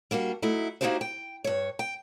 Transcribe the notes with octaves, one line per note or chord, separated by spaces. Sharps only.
G3 A#3 D4 F#4
F#3 A3 D#4 E4
A#3 D#4 E4 F#4 G4 C5
G5
G2 C#5
G5